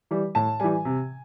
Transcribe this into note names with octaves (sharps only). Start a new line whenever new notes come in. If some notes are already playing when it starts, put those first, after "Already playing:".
E3 G3
A2 A5
E3 G3 G#5
C3